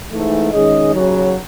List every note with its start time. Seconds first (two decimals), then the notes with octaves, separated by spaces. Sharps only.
0.09 G#2 E3 A3 D#4
0.51 D#3 G#3 C#4 G#4 D#5
0.93 D#2 C#3 F#3